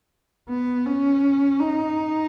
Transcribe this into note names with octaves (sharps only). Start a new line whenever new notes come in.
B3
C#4
D#4